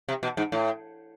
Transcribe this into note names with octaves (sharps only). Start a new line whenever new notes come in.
C3
B2
G#2
A2